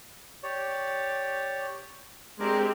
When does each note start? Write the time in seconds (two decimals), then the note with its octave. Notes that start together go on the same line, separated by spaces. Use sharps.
0.43 G4 C#5 D5
2.40 G#3 C4 D4 G4 A#4 D6